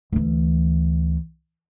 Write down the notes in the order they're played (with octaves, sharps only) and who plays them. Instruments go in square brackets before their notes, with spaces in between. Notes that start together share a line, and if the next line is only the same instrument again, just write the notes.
[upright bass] D2 E3